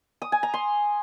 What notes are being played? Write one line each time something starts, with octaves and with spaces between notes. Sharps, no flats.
D#6
G#5
A#5
C6